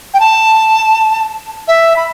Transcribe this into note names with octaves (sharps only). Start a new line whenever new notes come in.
G5
A5
E5
B5